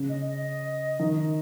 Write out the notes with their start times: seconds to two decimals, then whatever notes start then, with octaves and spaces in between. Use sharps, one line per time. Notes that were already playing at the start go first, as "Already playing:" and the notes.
Already playing: C#3
0.09 D#5
0.28 D#5
0.99 D#3